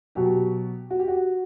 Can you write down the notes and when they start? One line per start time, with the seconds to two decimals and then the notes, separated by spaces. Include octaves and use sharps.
0.15 B2 F#3 G4
0.90 F#4
0.99 G4
1.08 F#4